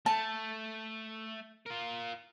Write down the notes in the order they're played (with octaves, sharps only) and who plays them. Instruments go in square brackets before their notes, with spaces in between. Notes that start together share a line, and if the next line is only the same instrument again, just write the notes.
[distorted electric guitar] A3 [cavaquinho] A5
[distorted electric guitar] F4 A#4